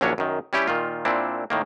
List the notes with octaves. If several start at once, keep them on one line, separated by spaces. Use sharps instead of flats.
A#1 D#2 F#3 C#4 D4 C#5
F#2 D#3
G3 C#4 E4 G4
A#2 D#3 F4
A#2 C4 D4 E4
A2 D#3 A#3